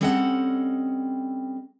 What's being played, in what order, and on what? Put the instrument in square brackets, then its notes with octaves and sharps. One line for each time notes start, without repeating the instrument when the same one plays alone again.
[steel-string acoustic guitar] G3 C4 C#4 A4 D#5 F#5